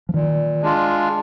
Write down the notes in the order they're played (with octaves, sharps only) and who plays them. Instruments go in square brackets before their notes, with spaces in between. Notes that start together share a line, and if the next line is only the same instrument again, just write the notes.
[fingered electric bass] F3
[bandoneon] A#2 [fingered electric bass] D#3
[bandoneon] G#3 D4 F4